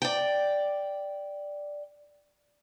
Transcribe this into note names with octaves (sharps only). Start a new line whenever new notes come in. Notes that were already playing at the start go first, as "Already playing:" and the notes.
D5 G5